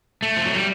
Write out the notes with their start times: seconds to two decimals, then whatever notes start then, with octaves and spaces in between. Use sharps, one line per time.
0.22 A3
0.37 F3
0.46 F#3
0.56 G3